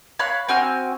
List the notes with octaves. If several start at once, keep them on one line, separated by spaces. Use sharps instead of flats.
C#5 F5 B5 F#6
C4 F#4 G#5 F6